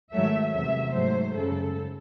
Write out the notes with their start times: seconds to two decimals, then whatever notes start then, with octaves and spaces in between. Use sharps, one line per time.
0.12 G#2 D#3 F#3 A3 E5
0.53 E2 C3 F#3 A3 E5
0.95 G#2 F#3 A3 C5
1.36 F#2 C#3 G#3 A4